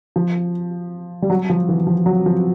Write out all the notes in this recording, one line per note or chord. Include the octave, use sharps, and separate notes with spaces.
F3
G3
F#3
F3
E3
F3
F#3
F3